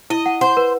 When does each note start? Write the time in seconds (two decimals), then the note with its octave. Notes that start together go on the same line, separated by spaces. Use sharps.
0.10 E4 D#5
0.26 F#5
0.41 C5 F#5
0.57 B4